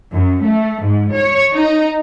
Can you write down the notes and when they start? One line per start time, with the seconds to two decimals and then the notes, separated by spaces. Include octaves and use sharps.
0.12 F#2
0.43 A3
0.83 G#2
1.14 C#5
1.54 D#4